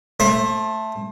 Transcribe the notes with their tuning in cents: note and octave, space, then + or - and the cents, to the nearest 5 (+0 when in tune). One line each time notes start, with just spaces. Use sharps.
A3 +0 C5 +30